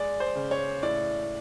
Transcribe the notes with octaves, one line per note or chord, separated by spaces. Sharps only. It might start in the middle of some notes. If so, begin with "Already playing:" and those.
Already playing: G#3 D5
C5
C#3
C#5
A2 D5